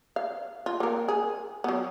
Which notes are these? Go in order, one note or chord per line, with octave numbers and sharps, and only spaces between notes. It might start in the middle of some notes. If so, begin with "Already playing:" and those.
F5
F4
A#3 A#4
G#4
F#3 B3